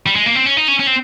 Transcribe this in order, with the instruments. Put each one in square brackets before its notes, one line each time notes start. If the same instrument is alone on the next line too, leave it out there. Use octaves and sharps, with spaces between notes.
[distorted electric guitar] G3
G#3
A#3
C4
C#4
D#4
C#4
C#4
C4